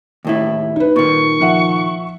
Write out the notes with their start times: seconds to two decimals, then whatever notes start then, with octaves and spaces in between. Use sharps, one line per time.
0.25 D#2 A2 E4
0.76 D#4 B4
0.96 A#2 D#3 C#6
1.41 F3 E5 F#5